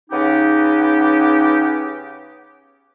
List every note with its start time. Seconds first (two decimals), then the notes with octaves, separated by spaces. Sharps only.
0.10 C#3 B3 C#4 D#4 G4